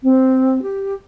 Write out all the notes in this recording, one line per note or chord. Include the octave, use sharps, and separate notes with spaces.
C4
G4